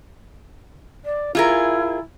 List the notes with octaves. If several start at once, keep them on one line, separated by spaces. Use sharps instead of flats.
D5
E4 F4 G#4 A#4